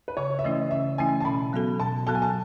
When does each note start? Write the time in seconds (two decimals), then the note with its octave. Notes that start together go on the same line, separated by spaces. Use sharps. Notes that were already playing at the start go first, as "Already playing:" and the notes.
0.08 B4
0.17 C#3 C#5
0.39 E5
0.44 E3 A3 C#4 E4 D#5
0.71 C#3 E5
0.98 E3 A3 C#4 E4 G#5
1.20 A5
1.25 B2 B5
1.53 F#3 B3 F#4 A4
1.80 B2 A5
2.07 F#3 B3 F#4 A4 A5
2.15 G#5
2.22 A5